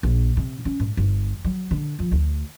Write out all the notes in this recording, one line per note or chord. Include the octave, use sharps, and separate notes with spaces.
A#1
C3
C#4
G#2
G1
F#3
D3
F3
D2